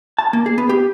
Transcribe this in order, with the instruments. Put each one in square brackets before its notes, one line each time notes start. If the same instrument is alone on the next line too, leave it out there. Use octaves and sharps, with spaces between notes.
[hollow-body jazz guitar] A5
A#3
G#4
B3
G4